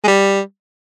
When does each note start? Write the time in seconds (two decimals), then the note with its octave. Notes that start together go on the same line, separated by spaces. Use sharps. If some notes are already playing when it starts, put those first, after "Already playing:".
0.04 G#3
0.08 G3